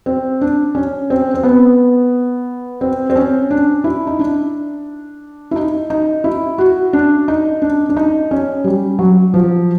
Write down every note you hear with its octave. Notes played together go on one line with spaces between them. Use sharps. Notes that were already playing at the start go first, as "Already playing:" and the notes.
C4
D4
C#4
C4
C4
B3
C4
C4
C#4
D4
E4
D#4
D4
E4
D#4
D#4
E4
F#4
D4
D#4
D4
D4
D#4
C#4
G3
F#3
F3